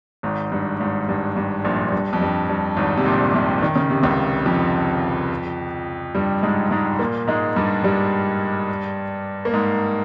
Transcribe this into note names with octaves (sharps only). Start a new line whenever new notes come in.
G#1 G#2
G2
G#1 G#2
G2
G2
A#1 A#2
G2
F2
G2
G2
G#1 G#2
C3
A#1 A#2
C2 C3
D#3
C#3
C3
C#2 C#3
F2 F3
G2 G3
G#2 G#3
G#2 G#3
A#2 A#3
G#2 G#3
G2 G3
G2 G3
A#3
G#2 G#3